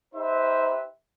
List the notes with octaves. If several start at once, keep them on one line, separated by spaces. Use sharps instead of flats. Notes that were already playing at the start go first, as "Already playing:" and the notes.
D#4 G4 B4 C5 E5